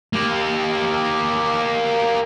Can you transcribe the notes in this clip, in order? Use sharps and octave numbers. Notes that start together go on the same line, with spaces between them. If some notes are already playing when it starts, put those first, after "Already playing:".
A#3 G4